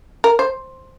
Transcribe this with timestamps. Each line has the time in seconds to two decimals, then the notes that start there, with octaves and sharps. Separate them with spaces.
0.24 A#4
0.39 C5